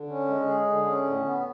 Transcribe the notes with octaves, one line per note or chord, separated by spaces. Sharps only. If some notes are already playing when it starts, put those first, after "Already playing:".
Already playing: D3
C#4
G#3
G#4
D3
C#4
A2
B3